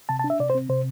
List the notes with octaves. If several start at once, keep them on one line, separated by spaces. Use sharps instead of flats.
C3 A5
A5
D4
E5
C3 D5
C5
C4
C3 C5